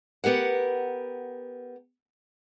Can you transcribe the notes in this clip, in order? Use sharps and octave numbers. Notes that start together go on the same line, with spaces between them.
B3 G4 A#4 F#5